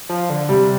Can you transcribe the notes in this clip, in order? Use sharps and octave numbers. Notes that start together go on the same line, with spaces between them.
F3
D3
C3 G3